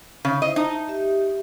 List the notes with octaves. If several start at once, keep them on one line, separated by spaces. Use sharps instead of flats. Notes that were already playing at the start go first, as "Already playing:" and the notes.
C#3 D#4 C#5
E4 C5 D#5 E5
D#4 A5 A#5
E5 A5
G4 E5